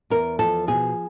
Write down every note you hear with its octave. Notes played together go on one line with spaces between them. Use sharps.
E2 A#4
F3 A4
B2 G#4